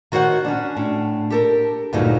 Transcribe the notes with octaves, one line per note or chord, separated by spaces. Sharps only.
D#3 F#4 C5 C#5 F#5
C#4 D4
A2
G4 A4 A#4
D2 G2 A#2 F#3 D#4 G#4